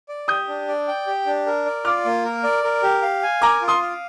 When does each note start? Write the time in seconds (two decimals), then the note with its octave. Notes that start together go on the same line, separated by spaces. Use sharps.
0.09 D5
0.28 G4 D#6 G6
0.48 D4
0.68 D5
0.88 G5
1.07 G4
1.26 D4
1.46 A#4
1.66 D5
1.85 F4 D6 F6
2.05 A#3
2.25 A#4
2.44 D5
2.64 A#4
2.83 G4
3.02 F5
3.23 G#5
3.42 A#4 A#5 D6
3.62 F4
3.68 C6 D#6
3.82 F5